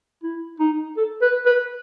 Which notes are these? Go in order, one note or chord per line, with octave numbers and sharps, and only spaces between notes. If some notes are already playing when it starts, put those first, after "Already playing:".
E4
D#4
A4
B4
B4